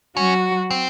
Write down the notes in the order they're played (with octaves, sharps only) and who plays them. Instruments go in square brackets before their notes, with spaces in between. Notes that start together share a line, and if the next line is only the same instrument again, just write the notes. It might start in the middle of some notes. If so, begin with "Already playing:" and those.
[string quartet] F#3 F#4 [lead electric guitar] C#4
[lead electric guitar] C4